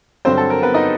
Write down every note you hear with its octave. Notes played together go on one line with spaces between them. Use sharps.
G2 D3 F#3 C4 C5
A4
A#4
B3 B4
D#4 D#5